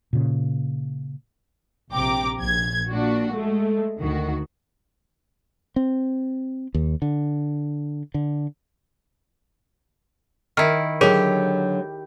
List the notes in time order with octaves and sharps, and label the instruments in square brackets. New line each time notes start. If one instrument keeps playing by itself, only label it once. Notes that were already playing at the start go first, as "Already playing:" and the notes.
[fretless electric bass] A#2 C#3
[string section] A#1 C3 G5 A#5 D6
A#1 G#6
A#2 D4 F#4
G#3 A3
D2 D#3 F#4
[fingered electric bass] C4
D#2
D3
D3
[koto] D#3 E4 [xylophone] F6
[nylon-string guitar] D3 F#3 [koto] G4 [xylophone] G#4 A#4 C#5